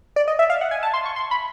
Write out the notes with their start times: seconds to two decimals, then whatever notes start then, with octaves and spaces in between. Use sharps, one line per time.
0.16 D5
0.28 D#5
0.39 E5
0.50 F5
0.61 F#5
0.71 G#5
0.83 A5
0.94 C6
1.06 C#6
1.16 C6
1.31 B5